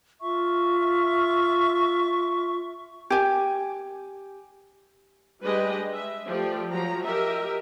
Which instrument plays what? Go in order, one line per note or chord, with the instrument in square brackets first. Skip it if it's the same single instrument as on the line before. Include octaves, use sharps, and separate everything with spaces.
[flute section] F4 E5 C#6
[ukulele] G4 G#5
[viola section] G3 G#3 D4 G4 B4 D#5
E5
F3 A3 G4 D5
F3 F#3 A#5
G4 A#4 D#5 E5